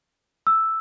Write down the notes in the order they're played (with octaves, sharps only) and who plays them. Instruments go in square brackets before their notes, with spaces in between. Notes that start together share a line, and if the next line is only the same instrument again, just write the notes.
[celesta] E6